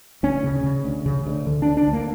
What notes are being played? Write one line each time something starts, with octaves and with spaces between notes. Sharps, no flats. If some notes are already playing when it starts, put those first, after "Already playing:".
D2 C#4
C#3
C#3
D2
C#3
D2
D3
D4
D2
D4
D2
A#3